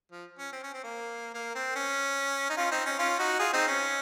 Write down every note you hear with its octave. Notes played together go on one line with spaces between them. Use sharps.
F3
C#4
C4
C#4
C4
A#3
A#3
C4
C#4
D#4
C#4 F4
C4 D#4
C#4
C#4 F4
D#4 F#4
F4 G#4
C4 D#4
C#4